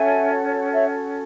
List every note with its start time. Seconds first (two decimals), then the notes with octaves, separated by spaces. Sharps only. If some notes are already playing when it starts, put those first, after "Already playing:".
Already playing: C#4 F#4 A4 C#5 E5 G#5
0.72 C#5 E5